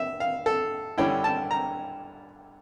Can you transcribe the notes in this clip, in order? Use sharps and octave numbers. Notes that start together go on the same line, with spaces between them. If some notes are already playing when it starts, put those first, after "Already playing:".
Already playing: E5
F5
A4
G2 D3 G3 C#4 E4 G5
A5
A#5